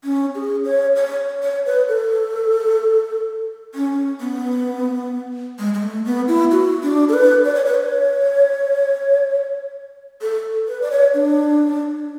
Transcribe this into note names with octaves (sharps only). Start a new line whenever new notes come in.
C#4
G#4
C#5
C#5
C#5
B4
A4
C#4
B3
G#3
G#3
A3
B3
E4
F#4
D4
A4
B4
D5
C#5
B4
C#5
A4
B4
D5
C#5
D4